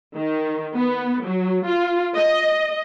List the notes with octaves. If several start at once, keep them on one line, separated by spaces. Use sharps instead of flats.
D#3
B3
F#3
F4
D#5